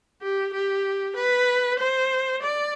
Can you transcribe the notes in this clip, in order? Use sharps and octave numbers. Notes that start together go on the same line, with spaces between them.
G4
G4
B4
C5
D5